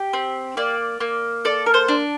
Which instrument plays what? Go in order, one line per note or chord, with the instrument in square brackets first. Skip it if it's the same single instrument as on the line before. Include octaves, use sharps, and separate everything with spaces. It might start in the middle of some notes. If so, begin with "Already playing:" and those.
Already playing: [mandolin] G4
C4
A#3 D5
A#3
A4 D5
A#4
C5
D4